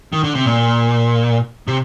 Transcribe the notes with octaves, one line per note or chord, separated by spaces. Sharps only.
D#3
D3
C3
A#2
C3